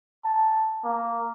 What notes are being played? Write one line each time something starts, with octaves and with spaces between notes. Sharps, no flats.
A5
A#3